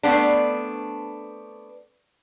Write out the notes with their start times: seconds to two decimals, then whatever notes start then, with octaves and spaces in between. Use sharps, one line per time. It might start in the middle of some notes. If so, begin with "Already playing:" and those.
0.03 A3 B3 C4 D4